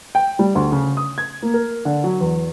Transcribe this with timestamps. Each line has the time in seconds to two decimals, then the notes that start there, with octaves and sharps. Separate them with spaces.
0.15 G5
0.39 G3
0.55 D2
0.72 C#3
0.97 D#6
1.18 G#6
1.42 A#3
1.54 A#4
1.85 D3
2.04 F#3
2.21 E2